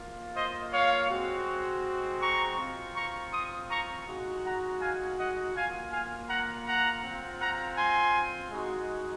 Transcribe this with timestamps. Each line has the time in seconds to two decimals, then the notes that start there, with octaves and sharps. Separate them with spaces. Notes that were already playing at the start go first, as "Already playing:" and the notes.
Already playing: A#3 F4
0.36 C5 D#5
0.74 C#5 F5
1.10 G#3 C4 F#4
2.22 A#5 C#6
2.59 C4 F4
2.96 A#5 C#6
3.33 C6 D#6
3.70 A#5 C#6
4.07 G#3 D#4 F#4
4.44 F#5 A#5
4.81 F5 G#5
5.18 D#5 F#5
5.55 A#3 F4 F5 G#5
5.92 F5 G#5
6.29 F#5 A#5
6.67 F#5 A#5
7.04 C4 F4
7.41 F#5 A#5
7.77 G#5 C6
8.51 G#3 D#4 F#4